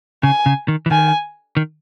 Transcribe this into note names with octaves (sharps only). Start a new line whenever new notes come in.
C#3 G#5
C#3
D#3
E3
D#3 G#5
D#3